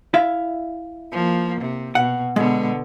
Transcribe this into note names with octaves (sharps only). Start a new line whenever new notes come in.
E4 E5 F5
F3 A#3
C3
B2 F#5
B2 D3 G#3 B3